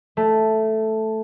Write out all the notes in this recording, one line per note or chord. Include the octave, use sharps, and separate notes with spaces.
A3